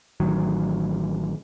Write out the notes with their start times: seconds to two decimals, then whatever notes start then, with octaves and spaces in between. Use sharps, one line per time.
0.20 A1 D#3 F#3